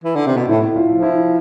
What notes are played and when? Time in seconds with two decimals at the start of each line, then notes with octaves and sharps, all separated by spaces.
0.04 E3
0.16 D3
0.27 C3
0.37 B2
0.48 A2 E4
0.76 F4
0.90 F3
1.03 E4